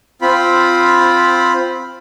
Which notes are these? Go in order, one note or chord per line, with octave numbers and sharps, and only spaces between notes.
C4 F4 B5